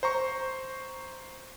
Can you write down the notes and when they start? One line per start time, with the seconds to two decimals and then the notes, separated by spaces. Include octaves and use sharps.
0.03 C5 A#5 C#6